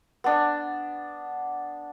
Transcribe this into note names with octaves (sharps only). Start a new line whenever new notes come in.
B3 D4